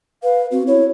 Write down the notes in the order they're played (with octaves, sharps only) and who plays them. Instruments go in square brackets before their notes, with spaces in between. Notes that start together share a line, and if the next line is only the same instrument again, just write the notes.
[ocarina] B4 [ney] F5
[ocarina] C4 [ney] F#4
[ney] E4 [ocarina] C#5